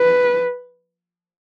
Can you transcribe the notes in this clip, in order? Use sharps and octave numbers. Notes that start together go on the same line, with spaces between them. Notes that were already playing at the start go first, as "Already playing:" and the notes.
Already playing: B4